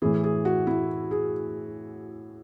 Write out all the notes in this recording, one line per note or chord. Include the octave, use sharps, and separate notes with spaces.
A2 E3 G#4
G#4
F#4
E4
G#4